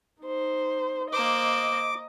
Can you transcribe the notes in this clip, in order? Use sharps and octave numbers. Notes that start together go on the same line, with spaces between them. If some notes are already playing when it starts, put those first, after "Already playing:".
D#4 C5
A#3 C5 D#5 D6